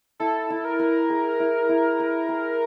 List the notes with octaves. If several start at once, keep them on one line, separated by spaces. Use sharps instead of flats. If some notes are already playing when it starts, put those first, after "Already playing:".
E4 A4
E4
A#4
B4
G#4
E4
E4
B4
G#4